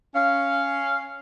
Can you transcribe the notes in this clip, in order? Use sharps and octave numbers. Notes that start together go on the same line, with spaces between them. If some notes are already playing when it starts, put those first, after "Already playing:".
C#4 F5